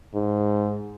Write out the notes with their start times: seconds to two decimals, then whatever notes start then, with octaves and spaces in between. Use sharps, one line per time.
0.15 G#2